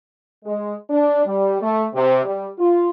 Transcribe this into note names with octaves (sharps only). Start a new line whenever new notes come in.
G#3
D4
G3
A3
C3
G3
F4